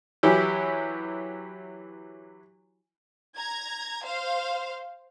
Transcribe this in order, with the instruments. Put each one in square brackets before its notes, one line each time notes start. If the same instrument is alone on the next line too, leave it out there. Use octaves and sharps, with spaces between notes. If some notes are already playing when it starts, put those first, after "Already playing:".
[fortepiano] E3 F#3 E4 G4
[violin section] A#5 G#6
C5 F5